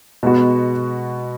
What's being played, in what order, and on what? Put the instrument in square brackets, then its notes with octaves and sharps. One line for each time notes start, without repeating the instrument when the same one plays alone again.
[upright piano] B2 G#3 B3 F#4